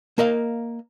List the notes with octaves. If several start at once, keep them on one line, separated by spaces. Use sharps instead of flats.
A#3 A#4 D#5 F5